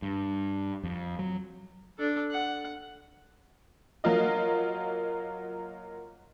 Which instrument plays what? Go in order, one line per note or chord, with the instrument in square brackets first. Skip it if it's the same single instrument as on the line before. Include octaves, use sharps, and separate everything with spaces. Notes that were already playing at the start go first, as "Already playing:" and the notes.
[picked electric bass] G2
F2
F#3
[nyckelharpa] D4 A4
F#5
[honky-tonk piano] F#3 A#3 F4 D#5